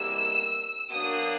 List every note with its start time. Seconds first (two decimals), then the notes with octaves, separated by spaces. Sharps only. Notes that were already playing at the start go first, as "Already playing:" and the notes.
Already playing: E2 C3 D#3 G3 A#3 E6
0.91 B2 F#3 A#3 D4 D#6